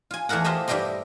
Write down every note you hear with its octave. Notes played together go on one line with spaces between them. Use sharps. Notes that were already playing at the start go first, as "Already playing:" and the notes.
F4 G#5
E2 A3 G#4 A#4 F#5
F4 G4 C5 D#5 E5
G2 G3 E4 G4 D#5 C6